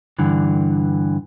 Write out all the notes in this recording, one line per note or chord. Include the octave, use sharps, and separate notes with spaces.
G2 D3 E3